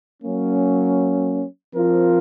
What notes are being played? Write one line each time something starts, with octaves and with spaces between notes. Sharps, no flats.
F#3 A#3 C#4
F3 C4 F4 A#4